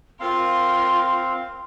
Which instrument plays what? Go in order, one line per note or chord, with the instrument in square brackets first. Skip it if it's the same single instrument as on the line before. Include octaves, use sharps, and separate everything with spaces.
[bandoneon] C4 F5 [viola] F4 A#4 [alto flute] C6